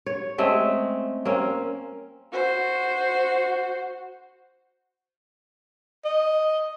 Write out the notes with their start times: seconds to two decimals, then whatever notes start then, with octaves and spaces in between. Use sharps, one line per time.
0.06 C#5
0.38 G#3 A3 C4 C#4
1.25 A#3 C4 C#4
2.32 F#4 C5
6.05 D#5